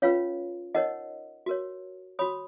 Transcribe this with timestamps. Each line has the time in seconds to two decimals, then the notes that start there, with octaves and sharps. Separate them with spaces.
0.02 C#4 F4 B4 C#5 F5
0.75 D#4 A#4 C#5 D#5 F#5
1.46 F#4 A#4 C#5
2.19 F#4 C#5 B5 D#6